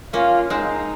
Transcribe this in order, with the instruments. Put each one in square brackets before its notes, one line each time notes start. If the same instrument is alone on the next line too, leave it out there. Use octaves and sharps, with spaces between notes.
[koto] A#3 C#4 [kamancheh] F4
[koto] G#3 C4 [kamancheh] D#4